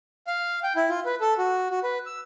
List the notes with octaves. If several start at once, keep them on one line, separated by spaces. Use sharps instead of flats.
F5
G5
E4
F4
B4
A4
F#4
F#4
B4
E6